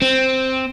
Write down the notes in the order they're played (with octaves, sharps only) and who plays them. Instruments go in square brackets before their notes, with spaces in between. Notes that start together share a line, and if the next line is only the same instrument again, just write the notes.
[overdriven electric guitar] C4